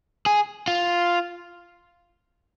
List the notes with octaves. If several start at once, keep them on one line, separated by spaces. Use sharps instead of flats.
G#4
F4